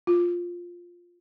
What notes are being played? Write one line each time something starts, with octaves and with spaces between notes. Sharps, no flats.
F4